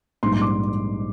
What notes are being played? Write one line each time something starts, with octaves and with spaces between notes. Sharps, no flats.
A#1 G#2 G3 C6
C6
D6